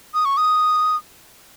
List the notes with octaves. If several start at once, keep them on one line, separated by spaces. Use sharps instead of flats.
D#6
C#6
D#6